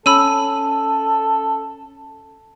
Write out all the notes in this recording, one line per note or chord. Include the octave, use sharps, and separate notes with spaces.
C#4 A4 B5 E6 D#7